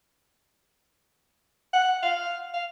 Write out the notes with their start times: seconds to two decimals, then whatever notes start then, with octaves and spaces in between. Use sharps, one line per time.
1.73 F#5
2.03 F5
2.54 F5